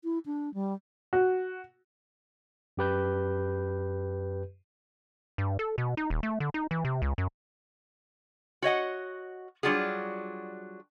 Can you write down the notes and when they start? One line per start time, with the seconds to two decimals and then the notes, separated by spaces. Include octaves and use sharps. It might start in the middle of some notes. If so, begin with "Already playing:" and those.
0.04 E4
0.26 D4
0.54 G3
1.13 F#4
2.77 F#2 G4 B4 G6
5.38 G2
5.59 A4
5.78 B2
5.97 D#4
6.10 D#1
6.23 A3
6.40 D3
6.54 D#4
6.71 E3
6.85 C3
7.02 C#2
7.18 F#2
8.62 F#4 C#5 D#5 F#5
9.63 F#3 G3 D4 F4 F#4 G#4